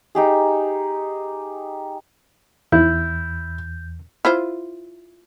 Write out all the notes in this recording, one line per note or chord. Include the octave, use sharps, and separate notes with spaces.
D#4 G4 G#4
E2 E4 G6
E4 F4 C5